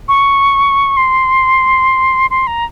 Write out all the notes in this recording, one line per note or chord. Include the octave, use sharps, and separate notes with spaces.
C#6
C6
C6
A#5